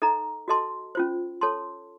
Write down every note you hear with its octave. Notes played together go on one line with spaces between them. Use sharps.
D#4 A4 D#5 A#5
F#4 A4 D#5 A5 C6
C#4 F4 C5
A4 C#5 A5 C6